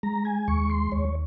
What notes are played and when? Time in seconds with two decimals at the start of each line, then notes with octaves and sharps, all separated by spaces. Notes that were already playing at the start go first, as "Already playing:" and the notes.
0.03 G#3 A#5
0.25 G#5
0.48 D#2 C#6
0.70 C6
0.92 D#2 C#5